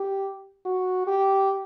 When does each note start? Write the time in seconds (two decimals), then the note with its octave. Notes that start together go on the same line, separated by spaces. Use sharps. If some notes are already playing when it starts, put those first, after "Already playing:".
Already playing: G4
0.65 F#4
1.07 G4